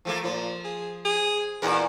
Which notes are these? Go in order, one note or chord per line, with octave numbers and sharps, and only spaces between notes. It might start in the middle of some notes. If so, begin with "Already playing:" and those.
F3 A3 A#3
A#2 F3
G#4
G#4
E2 A#2 C#3 A#4